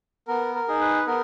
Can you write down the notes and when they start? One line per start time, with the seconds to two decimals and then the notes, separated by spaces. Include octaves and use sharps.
0.28 B3 A#4
0.55 A#4
0.68 D#4 G#4
0.81 B4
1.07 B3 A#4